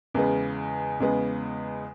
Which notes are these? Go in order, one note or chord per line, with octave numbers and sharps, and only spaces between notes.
E2 C#3 G#3 B3
E2 C#3 G#3 B3